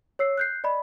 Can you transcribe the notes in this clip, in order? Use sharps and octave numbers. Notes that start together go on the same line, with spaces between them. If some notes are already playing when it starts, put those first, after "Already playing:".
C#5 E6 C7
F#6 G6 C7
D5 D#5 B5